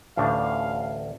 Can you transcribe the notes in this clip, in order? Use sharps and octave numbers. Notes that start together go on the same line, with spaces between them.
A1 D2 D4 F5